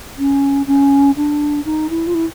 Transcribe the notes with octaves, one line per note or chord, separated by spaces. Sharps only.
C#4
C#4
D4
D#4
E4
F4
E4